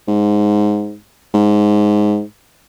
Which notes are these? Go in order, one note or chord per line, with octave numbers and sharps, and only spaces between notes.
G#2
G#2